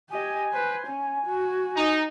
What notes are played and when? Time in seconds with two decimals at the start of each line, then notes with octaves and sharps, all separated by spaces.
0.10 G4 D#5 G#5
0.52 B4 C5
0.87 C#4
1.26 F#4
1.77 D#4